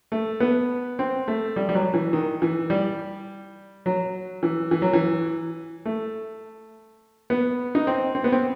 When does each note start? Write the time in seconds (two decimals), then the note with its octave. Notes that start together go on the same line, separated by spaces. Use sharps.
0.12 A3
0.40 B3
0.99 C4
1.28 A3
1.56 G3
1.69 G3
1.75 F#3
1.94 E3
2.13 D#3
2.42 E3
2.70 G3
3.86 F#3
4.43 E3
4.71 E3
4.82 F#3
4.93 E3
5.85 A3
7.30 B3
7.75 D#4
7.87 C4
8.15 C4
8.24 B3
8.32 C4